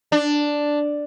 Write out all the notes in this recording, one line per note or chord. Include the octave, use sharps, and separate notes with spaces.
D4